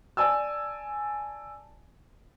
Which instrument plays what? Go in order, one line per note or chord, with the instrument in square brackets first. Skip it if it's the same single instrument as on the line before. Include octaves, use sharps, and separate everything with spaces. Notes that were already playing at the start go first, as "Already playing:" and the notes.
[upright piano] D5 G#5 A5 E6